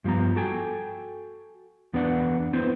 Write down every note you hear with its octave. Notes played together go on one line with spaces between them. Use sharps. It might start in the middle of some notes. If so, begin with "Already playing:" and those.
G2 F3 G3 B3 A#5
F#4 A4 G5 G#5
E2 B3 D4 B4 D5 F#5
B3 C4 E4 B4 C5